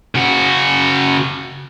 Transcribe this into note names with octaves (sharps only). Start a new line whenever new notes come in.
C#3 F#4